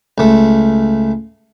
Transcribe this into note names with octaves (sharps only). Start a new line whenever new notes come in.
C#2 A3